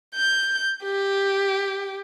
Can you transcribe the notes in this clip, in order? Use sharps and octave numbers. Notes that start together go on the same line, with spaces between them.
G6
G4